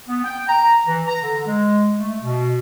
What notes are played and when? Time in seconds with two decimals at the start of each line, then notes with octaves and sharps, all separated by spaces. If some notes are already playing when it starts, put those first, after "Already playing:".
0.09 B3
0.25 G5
0.49 A#5
0.87 E3
1.07 A#5
1.23 D3
1.47 G#3
1.99 A3
2.23 B2